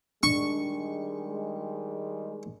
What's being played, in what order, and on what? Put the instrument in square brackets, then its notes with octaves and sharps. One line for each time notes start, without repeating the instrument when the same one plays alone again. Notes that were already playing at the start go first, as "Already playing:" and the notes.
[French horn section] D#3 G3 G#3 [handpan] D4 [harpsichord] C#6